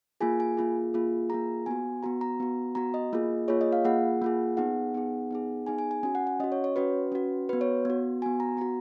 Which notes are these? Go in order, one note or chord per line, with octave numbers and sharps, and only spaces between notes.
A#3 F4 G#4 G#5
G#5
A#3 F4 G#4
A#3 F4 G#4
A#3 F4 G#4 A#5
B3 F#4 G#5
B3 F#4 A#5
A#5
B3 F#4
B3 F#4 A#5
D#5
A#3 F4 G#4
A#3 F4 G#4 C#5
D#5
F5
A#3 F4 G#4 F#5
A#3 F4 G#4
B3 D#4 G#4 F#5
B3 D#4 G#4
B3 D#4 G#4
B3 D#4 G#4 G#5
G#5
G#5
C#4 F#4 G#5
F#5
F#5
C#4 F#4 D#5
C#5
C#5
C#4 F#4 B4
C#4 F#4
B3 F#4 B4
C#5
B3 F#4
B3 F#4 G#5
A#5
B3 F#4 A#5